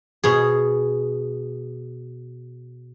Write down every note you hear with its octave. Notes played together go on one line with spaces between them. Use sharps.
B2 G#4